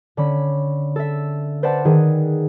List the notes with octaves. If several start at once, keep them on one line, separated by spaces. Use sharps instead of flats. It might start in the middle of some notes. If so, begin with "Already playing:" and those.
D3 C#4 B5
A4 E5
B4 C5 D5 E5 F#5 A5
D#3 G#4 B4